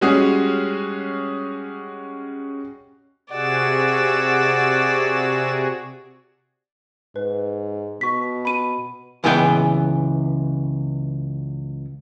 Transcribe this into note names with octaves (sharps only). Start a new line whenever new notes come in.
G3 G#3 C#4 F#4 G#4
C3 F#4 G#4 D5 F#5 E6
G#2 B4
B2 C#6 B6
B5 D#7
C#2 E3 B3 G#4 D#5 G5